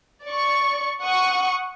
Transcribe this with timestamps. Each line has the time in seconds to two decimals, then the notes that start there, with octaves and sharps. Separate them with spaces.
0.24 D5 C#6
1.02 F#5 C#6 D#6